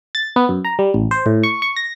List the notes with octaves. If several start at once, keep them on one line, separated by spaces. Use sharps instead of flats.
A6
B3
F#2
A#5
G3
A1
C5
A2
C#6
C#6
A#6